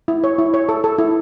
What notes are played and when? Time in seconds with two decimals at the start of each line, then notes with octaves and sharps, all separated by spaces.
0.08 E4
0.24 C#5
0.38 E4
0.54 C#5
0.69 A4
0.84 A4
0.98 E4